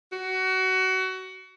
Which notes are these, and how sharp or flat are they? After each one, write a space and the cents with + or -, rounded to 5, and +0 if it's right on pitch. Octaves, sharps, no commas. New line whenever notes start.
F#4 +25